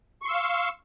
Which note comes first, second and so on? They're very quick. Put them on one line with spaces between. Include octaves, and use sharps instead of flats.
C#6 C6 E6 F5